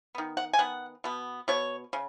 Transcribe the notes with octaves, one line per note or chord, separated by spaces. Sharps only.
D#3 B3
F#5
G#5
D#3 B3 F#5
B2 B3
B2 B3 C#5
C#3